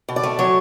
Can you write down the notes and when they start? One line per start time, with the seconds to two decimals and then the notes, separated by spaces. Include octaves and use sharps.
0.09 B2
0.16 D5
0.23 A3
0.39 F#3 C#5